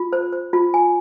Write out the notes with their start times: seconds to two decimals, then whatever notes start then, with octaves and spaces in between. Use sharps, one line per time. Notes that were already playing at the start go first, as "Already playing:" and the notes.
Already playing: F4
0.13 C5
0.32 C5
0.53 F4
0.74 G#5